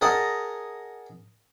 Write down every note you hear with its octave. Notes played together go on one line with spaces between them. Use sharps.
G#4 A#4 D#5 F#5 A5